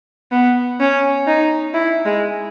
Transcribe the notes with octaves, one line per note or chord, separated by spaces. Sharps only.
B3
C#4
D#4
E4
G#3